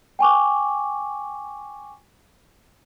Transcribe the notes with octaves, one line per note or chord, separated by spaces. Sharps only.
G5 G#5 C#6 D6